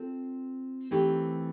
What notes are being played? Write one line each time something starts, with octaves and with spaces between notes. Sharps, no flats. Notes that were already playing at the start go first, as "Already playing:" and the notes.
Already playing: C4 F4 A4
E3 A3 C4 D#4 G4